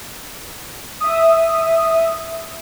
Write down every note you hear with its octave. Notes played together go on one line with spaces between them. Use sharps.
E5 D#6